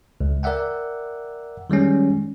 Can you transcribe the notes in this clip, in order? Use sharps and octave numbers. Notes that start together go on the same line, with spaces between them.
C#2
A#4 D5 E5 F#5 G5
D#3 G3 G#3 C#4